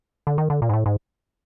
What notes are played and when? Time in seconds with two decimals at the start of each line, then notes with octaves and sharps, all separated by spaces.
0.27 D3
0.38 D#3
0.50 D3
0.62 A#2
0.69 G#2
0.73 A2
0.86 G#2